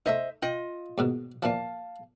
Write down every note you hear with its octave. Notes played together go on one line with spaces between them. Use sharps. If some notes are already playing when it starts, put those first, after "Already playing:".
A3 D#4 C5 D#5 E5
F4 D#5 G5
D#2 G#2 B2
A#2 E3 F3 F5 A5